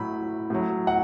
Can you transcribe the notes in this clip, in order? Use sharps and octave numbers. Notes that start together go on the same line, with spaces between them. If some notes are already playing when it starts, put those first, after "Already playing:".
Already playing: A2 F#3 B5
A2 F#3
F#5